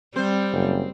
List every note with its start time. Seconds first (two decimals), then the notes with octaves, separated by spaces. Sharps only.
0.16 G3 C4 C5
0.53 F#1